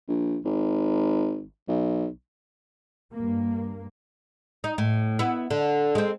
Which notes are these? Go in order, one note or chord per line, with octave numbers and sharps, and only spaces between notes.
A#1
G#1
B1
G2 A#3
D#4
A2
B3 E4
D3
G#3 C4